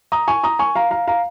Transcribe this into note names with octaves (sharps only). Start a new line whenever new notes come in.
A#5 D#6
G#5 C#6
A#5 D#6
G#5 C#6
F5 A#5
F5 A#5
F5 A#5